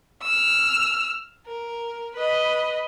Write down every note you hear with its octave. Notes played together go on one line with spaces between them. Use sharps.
E6 F6
A#4
B4 D#5